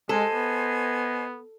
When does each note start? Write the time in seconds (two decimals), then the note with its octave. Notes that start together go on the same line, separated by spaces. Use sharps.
0.09 G#3 A4 C5 D#5 G#5
0.34 B3